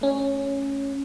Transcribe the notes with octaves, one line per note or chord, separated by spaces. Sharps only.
A3 C#4